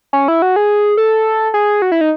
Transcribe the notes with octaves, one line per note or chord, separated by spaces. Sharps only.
C#4
E4
F#4
G#4
A4
G#4
F#4
E4
D#4